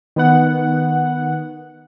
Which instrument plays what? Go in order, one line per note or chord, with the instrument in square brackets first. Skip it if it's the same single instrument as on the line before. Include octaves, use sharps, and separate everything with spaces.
[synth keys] D#3 B3 F#5